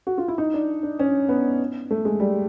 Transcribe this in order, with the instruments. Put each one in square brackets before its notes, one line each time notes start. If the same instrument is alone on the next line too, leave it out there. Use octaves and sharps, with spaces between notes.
[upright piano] F#4
F4
E4
D#4
D4
D4
C#4
B3
A3
G#3
G3